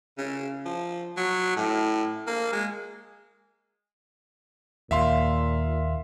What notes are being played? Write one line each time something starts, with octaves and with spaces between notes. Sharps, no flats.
C#3
F3
F#3
A2
A#3
G#3
D#2 A#2 E5 F5 C6